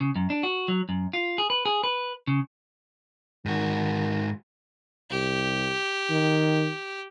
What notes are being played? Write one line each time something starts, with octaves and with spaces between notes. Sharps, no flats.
C#3
F#2
D4
F#4
F#3
F#2
F4
G#4
B4
G#4
B4
C#3
G#2 D#3 F#4
C2 G4
D#3